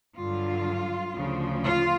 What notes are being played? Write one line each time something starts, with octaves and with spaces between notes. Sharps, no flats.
G2 D3 F#3 F4
D2 C#3 F3
F4